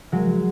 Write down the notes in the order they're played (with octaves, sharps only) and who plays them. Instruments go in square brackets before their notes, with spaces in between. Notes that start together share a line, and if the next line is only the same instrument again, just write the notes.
[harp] F#3 G#3